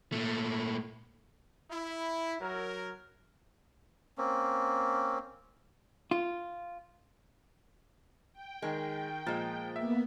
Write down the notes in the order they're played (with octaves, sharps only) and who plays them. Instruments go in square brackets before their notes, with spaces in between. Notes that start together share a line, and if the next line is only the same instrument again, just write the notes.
[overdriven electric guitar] A#2 A3
[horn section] E4
F#3 A#4
[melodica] A#3 C4 C#4
[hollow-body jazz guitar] F4
[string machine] G5
[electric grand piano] D#3 A#4 [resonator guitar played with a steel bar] G#3
[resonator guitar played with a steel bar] A#2 G#3 [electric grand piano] F3 A6
[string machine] A#3 B3 [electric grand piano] E5